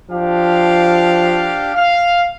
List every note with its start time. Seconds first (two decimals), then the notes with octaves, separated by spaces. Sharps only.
0.10 F3 D4 G4 F5
1.74 F5